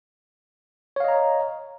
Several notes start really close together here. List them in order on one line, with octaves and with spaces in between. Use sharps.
C#5 F5 D#5 A#5